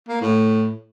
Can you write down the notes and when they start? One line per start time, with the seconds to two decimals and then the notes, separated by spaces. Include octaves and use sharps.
0.09 A#3
0.21 A2